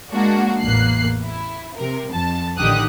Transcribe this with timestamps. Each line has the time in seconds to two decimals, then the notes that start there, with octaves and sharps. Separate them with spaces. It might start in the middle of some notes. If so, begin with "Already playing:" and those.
0.11 G#3 A#3 D4 F#4
0.61 A1 E2 A#3 F#6 C7
1.24 E4
1.76 C3 A#4
2.12 F2 A5
2.58 A1 D3 D#3 G4 D#6 F#6